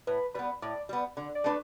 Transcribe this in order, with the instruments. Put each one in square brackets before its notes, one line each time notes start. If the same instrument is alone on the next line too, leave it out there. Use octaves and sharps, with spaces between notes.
[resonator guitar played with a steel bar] A2 [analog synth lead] B4
[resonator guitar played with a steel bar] G3 B3 [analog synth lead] B4
[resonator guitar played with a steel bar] A2 [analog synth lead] D5
[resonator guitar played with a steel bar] G3 B3
D3
[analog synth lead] D5
[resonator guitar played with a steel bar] A3 D4 B4